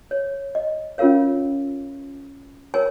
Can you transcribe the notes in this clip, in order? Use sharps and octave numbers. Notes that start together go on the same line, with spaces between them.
C#5
D#5
C#4 F4 A#4 C#5 F5
A#4 C#5 G#5